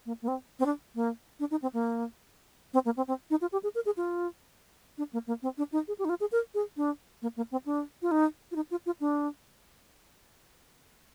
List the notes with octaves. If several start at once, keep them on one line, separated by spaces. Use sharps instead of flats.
A#3
A#3
C4
C4
D4
A#3
D4
D#4
C4
A#3
C4
A#3
C4
C4
D#4
F4
G4
G#4
A#4
G#4
F4
D4
A#3
A#3
C4
D4
D#4
G#4
G4
D#4
F4
G#4
A#4
G#4
D4
A#3
A#3
C4
D4
F4
D#4
F4
D#4
F4
F4
D4